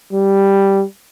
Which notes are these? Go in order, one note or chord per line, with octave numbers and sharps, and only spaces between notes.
G3